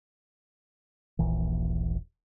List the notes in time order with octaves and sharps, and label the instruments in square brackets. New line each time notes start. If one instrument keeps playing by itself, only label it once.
[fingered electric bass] D#1 A#1 E3